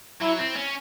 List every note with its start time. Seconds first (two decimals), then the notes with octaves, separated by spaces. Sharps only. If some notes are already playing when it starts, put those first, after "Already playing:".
0.22 F#3 E4
0.39 C4
0.56 C#4